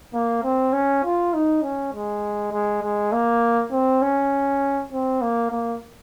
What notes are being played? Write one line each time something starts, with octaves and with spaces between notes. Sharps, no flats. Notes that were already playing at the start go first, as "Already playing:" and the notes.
A#3
C4
C#4
F4
D#4
C#4
G#3
G#3
G#3
A#3
C4
C#4
C4
A#3
A#3